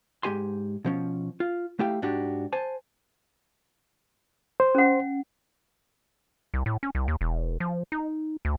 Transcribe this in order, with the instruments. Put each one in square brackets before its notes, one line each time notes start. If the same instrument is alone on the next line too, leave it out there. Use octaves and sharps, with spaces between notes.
[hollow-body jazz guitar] G#2 A#3 G4 G#5 C6
B2 F3 C#4
F4
A3 E4 G4 F5 G5
G#2 D4 F#4 G4
C5 G#5 A5
[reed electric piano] C5
[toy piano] C#4 F#5
[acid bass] C2
A2
C#4
C2
D#2
E1
F3
D#4
D2